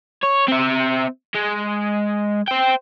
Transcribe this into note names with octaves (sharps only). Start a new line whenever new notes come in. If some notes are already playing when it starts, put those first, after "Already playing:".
C#5
C4 E5
G#3
C5 G5